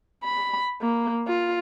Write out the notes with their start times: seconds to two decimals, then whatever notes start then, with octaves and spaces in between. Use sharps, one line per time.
0.24 B5
0.81 A#3
1.27 F4